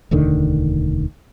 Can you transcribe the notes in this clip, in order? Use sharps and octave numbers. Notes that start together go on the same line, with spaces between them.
E1 D2 D3 D#3